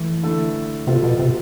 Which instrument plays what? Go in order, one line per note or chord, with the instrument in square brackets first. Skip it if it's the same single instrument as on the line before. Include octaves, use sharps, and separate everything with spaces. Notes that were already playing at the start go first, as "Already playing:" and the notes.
Already playing: [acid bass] E3 [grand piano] A3
[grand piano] D3 A3 E4 A4
[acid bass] C3 [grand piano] F3 B3 F4 A4
[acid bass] B2
C3